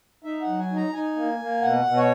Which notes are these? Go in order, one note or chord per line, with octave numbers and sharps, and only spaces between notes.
D#4 E5
F#5
F#3
G#5
D#4
A#5
D#4 G#5
A#3
A#3
B2 F#5
B2
C#5